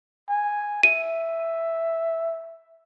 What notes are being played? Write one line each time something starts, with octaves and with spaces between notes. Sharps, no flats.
G#5
E5 D#7